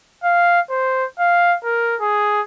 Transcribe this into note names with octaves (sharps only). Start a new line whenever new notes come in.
F5
C5
F5
A#4
G#4